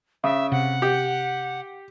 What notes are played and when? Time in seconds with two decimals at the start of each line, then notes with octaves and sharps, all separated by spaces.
0.24 C#3 E5
0.52 C3 F#5
0.82 G4